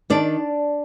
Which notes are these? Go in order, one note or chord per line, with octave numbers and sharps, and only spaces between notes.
D#3 D4 D5